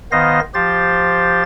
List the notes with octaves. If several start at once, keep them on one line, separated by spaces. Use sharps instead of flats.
D#3 B3 C5 D#5 F5 A#6
F3 G4 C5 A6